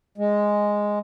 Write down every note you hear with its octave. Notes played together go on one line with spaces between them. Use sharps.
G#3